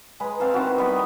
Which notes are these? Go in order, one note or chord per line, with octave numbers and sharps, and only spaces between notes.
G#3 B4 A#5
C4 F5 A5 C6
D#3 C4 E4 F#4
G3 B3 D#5 B5